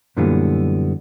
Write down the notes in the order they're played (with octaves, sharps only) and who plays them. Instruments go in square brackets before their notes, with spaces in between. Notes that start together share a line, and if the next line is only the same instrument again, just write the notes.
[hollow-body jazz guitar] F#2 A#2 D3 E3 G3 B3